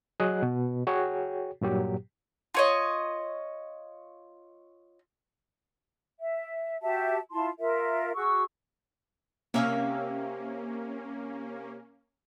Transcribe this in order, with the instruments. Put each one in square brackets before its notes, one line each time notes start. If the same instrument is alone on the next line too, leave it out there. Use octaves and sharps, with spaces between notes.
[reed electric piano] F#3 G#4 D#5 F#6
B2
F#4 G#4 C#5 G5
G2 A#2 F#3 G4
[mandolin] F4 C#5 D#5
[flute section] E5
F#4 G4 E5 A5
E4 F4 A5 C6
F4 A#4 E5
F#4 G#4 C#6 E6
[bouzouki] C3 E5 F5 [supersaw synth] A#3 C#4